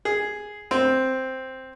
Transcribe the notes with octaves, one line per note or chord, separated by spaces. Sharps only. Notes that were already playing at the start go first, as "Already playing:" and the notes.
G#4
C4